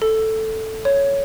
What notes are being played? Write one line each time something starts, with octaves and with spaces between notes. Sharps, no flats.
A4
C#5